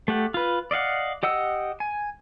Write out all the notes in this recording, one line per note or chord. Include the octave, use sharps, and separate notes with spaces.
A3 G4 F#5
F4 B4
D5 D#5 F5 F#5
G4 D#5 F#5 E6
G#5